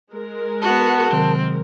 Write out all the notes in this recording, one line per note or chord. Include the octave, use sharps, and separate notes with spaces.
G#3 A#4
B3 F#4 A5
C3 D#3 F#3 C4